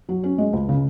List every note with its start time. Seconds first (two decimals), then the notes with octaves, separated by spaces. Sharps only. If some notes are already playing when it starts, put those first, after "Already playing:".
0.09 F#3
0.23 C#4
0.38 G#3
0.53 C#2
0.69 C#3